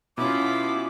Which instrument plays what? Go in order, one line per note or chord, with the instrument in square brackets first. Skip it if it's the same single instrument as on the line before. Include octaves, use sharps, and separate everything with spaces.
[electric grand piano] B2 C#4 [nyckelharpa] E4 F4 [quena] D6